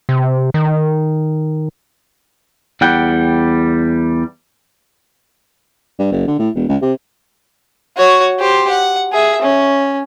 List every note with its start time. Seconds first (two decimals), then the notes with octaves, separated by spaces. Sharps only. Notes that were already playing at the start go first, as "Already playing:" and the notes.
0.09 C3
0.54 D#3
2.81 E2 G3 F#5 G5
5.99 G2
6.12 F#1
6.28 D3
6.39 A2
6.55 E1
6.69 C#2
6.82 C3
7.97 F#4 C#5
8.39 G4 C5
8.70 F#5
9.12 G#4 E5
9.42 C#4